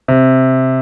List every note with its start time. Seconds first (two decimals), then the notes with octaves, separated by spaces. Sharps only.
0.08 C3